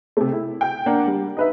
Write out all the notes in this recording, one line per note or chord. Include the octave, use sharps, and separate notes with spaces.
C3 A3
E4
G5 G6
A#3 D4 F#5
G3
D#4 B4 E5